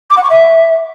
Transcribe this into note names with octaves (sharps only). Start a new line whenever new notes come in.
D6
F#5
C#6
E5